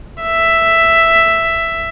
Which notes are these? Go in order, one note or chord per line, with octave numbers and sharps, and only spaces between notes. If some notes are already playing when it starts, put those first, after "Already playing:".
E5